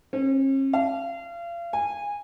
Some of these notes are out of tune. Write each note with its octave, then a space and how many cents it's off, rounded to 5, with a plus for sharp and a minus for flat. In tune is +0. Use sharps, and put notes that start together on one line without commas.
C#4 -45
F5 -35
G#5 -20